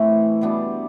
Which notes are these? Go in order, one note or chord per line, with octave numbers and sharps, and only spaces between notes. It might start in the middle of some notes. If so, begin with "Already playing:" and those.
Already playing: A2 E3 A3 C4
B2 G3 B3 D4